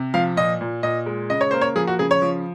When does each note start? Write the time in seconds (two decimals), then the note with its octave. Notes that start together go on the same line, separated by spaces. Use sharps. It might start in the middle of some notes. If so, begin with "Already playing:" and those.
Already playing: C3
0.14 F3 F5
0.36 A#2 D#5
0.61 A#2
0.83 A#2 D#5
1.06 G#3
1.30 C#3 D#5
1.41 C#5
1.51 A#3 C5
1.61 C#5
1.75 F3 G#4
1.87 F#4
1.99 C#3 G#4
2.11 C#5
2.22 F3